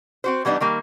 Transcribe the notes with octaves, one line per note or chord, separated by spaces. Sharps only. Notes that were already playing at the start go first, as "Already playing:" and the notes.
C4 F#4 C5
E3 G3 B3 D4 D#4
D#3 G3 A#3